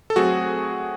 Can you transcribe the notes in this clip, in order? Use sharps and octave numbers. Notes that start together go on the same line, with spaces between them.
A4
F#3 A3 C4 F#4 G#4